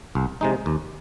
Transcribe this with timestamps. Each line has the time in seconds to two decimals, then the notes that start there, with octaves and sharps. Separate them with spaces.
0.15 C2
0.41 C3 G#3 D#4
0.66 D#2